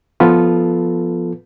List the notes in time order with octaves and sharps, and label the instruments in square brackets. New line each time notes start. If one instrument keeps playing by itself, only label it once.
[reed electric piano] F3 B3 F4 A4 B4